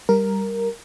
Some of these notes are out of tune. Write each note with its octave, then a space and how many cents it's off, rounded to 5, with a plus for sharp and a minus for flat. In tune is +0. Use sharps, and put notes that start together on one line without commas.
G3 +0 A#4 +0